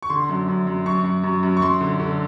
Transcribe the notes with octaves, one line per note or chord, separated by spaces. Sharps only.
C#6
D3 C6
F#2
F#2
F#2
F#2 C#6
F#2
F#2
F#2
C#6
F#2 C6
D3
D3